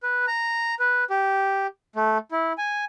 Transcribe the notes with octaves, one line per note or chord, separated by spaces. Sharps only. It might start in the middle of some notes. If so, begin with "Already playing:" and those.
B4
A#5
B4
G4
A3
E4
G#5